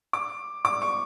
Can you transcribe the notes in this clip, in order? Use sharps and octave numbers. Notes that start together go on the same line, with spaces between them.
D6
D6
C#6